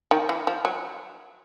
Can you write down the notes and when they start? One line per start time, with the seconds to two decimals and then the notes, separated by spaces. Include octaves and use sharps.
0.11 D#3
0.29 E3
0.47 F3
0.65 F#3